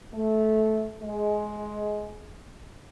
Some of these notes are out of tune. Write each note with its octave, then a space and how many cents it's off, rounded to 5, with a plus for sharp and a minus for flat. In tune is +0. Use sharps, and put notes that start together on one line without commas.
A3 -15
G#3 +15